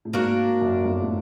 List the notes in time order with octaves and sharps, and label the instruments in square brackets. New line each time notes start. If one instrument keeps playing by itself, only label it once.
[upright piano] A2
[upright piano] G#1 G#2 [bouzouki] A#3 D4 F#4 A#4
[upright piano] F#2
G1 G2
A2